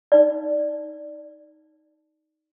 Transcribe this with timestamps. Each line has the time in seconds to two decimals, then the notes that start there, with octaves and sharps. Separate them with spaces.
0.12 D#4 D5